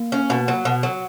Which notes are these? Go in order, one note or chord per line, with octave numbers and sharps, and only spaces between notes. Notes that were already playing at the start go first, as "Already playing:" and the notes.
Already playing: A#3
C#4
B2
F#3
B2
F#3